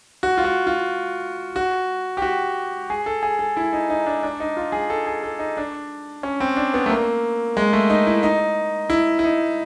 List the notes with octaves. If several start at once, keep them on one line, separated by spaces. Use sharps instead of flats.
F#4
F4
F#4
F4
F#4
G4
F#4
G#4
A4
G#4
A4
E4
D#4
D#4
D4
D4
D#4
F4
G#4
A4
G#4
A4
D#4
D4
C#4
C4
D4
B3
A3
A#3
G#3
A3
D#4
E4
D#4
E4
E4
D#4